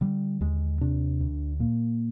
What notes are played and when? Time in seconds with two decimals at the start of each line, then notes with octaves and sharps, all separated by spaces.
0.01 D3 G3
0.41 D#2 G#3
0.81 C3 D4
1.20 D2
1.59 A#2 A#3